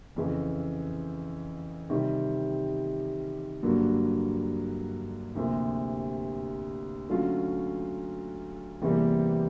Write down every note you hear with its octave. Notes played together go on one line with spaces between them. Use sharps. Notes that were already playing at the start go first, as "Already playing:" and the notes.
F2 C#3 E3
C3 D#3 G3
G2 D3 F#3 A#3
D2 C3 F3 A#3
D3 F#3 A3 C#4 F4
E2 C3 E3 G3 A#3